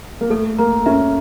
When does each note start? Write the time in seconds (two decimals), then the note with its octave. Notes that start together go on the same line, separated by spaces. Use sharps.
0.21 A#3
0.30 A3 A4
0.59 A#3 A#5
0.86 C#4 E5